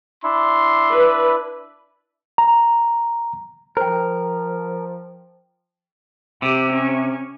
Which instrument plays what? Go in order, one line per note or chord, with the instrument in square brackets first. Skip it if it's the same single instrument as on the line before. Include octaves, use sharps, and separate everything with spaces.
[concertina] D4 E4 [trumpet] C6
[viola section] B4
[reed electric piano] A#5
[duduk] F3 [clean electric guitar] A#4 [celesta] C5 G5
[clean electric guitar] C3 [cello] G4
[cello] C#4